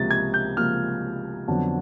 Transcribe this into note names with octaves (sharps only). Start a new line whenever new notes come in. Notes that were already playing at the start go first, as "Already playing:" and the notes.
Already playing: C#2 C3 F3 A#3 A6
G#6
G6
C#2 C3 F3 A#3 F6
F2 D3 F#3 B3 D4